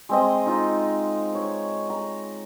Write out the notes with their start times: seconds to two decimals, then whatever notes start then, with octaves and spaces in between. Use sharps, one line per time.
0.09 G#3 C4 D#5
0.46 D#4 F4
1.35 C#5
1.90 A#5